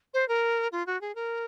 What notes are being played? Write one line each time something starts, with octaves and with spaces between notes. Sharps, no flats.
C5
A#4
F4
F#4
G#4
A#4